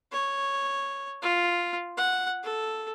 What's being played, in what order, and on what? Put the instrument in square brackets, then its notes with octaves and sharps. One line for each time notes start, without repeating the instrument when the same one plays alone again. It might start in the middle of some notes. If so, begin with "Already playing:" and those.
[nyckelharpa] C#5
F4
F#5
A4